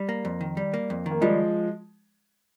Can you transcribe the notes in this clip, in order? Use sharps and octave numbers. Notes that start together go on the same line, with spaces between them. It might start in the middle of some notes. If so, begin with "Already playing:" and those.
Already playing: G3
A#3
F2
D#3
G3
A#3
F2
D#3
A#3
F3 G3 G#3